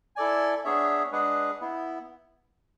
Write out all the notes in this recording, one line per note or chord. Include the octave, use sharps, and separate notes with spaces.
E4 A4 D5 G#5
B3 D4 G#4 C#5 E5
G#3 D4 G#4 B4 F#5
B3 E4